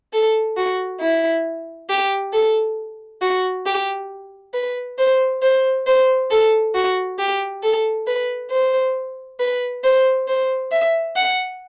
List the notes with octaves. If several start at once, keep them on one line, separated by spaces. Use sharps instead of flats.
A4
F#4
E4
G4
A4
F#4
G4
B4
C5
C5
C5
A4
F#4
G4
A4
B4
C5
B4
C5
C5
E5
F#5